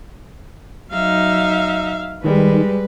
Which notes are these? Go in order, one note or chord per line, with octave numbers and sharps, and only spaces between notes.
F#3 D#4 E5 F5
D#3 G3 G#3 B4